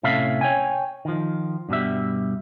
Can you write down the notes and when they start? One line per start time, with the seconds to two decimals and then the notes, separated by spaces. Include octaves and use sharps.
0.03 A2 C3 C#4 A4 E5 F5
0.41 C#5 G5 G#5
1.05 D#3 F3
1.69 G2 B2 G3 E5